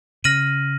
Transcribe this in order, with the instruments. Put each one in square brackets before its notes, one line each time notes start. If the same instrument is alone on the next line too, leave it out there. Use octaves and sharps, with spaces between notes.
[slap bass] C#3 [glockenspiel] F6 A#6 D#7 F#7